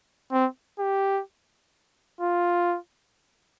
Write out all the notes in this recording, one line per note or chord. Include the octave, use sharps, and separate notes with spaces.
C4
G4
F4